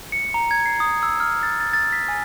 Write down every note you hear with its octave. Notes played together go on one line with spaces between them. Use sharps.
C#7
A#5
G#6
C7
D#6
E6
F6
A6
A6
A6
B6
G#5